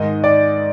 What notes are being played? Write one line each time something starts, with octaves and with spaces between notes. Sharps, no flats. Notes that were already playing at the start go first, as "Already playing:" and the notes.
Already playing: G#2 D#3 D#5
D5